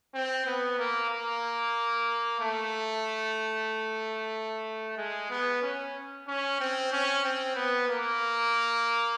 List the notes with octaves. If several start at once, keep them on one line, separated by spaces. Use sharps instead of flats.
C4
B3
A#3
A#3
A3
G#3
B3
C#4
C#4
C4
C#4
C4
B3
A#3